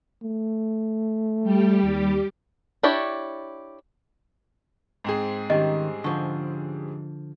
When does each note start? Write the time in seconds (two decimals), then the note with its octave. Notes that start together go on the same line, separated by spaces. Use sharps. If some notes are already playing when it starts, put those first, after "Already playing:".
0.23 A3
1.43 G3 G4
1.83 D#2
2.83 D4 E4 G4 C#5 D5
5.04 G#2 C4 G#4
5.50 D#3 G3 C#4 G4 D#5
6.04 D3 F3 C#6